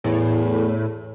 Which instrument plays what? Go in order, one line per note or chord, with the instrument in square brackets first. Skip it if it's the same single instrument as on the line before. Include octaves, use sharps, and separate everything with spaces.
[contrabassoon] E2 [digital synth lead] A2